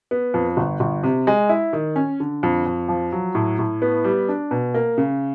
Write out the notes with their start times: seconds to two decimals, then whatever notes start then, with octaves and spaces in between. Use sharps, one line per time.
0.11 B3
0.34 F2
0.57 G1
0.80 G1
1.03 C3
1.27 G#3
1.49 E4
1.73 D#3
1.96 C#4
2.20 D3
2.43 F2
2.66 F2
2.88 F3
3.12 F#3
3.35 A2
3.59 A2
3.82 B3
4.04 G3
4.29 D4
4.51 B2
4.74 A#3
4.98 C#3